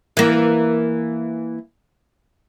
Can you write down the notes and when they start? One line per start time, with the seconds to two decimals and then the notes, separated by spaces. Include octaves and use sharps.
0.17 E3 A#3